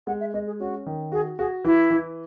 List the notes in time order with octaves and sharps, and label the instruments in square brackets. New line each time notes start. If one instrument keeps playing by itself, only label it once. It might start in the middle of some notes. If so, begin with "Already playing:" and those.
[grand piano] G#3 [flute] F#5
[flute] E5
[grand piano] G#3 [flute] D#5
[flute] G#4
[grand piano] C#4 [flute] F#4
[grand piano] D#3
[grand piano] F#4 [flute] G#4
[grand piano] F#4 [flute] G#4
[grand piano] E3 [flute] E4
[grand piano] E3